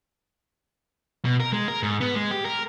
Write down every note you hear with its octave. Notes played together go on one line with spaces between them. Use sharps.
B2
A#4
G#3
A#4
G#2
B3
G#3
G4
A#4